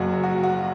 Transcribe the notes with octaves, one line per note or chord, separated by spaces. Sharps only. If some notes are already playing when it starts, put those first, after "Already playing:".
Already playing: F#1 F#2 F#3 F#4
F#4
F#4